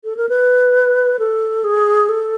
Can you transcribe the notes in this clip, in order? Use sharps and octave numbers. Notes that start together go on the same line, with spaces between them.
A4
A#4
B4
A4
G#4
A4